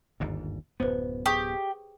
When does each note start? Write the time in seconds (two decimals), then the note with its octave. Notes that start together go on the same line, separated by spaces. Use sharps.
0.20 G1 D#2 G#2
0.80 D1 F#2 B3 B4 C5
1.26 G4 G#4 C#6 D#6